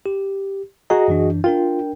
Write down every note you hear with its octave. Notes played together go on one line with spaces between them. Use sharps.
G4
F#4 G#4 D#5 A#5
F#2 E3 D4
D4 F4 A#4 G5